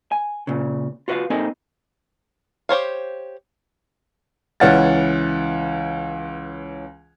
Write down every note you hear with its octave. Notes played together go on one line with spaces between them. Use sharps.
G#5
A#2 C#3
F4 F#4 B4 E5 F5
A#3 C4 D#4 A4 D#5 G#5
G4 C5 C#5 F5
C#2 E3 C#4 F#5 F6 A6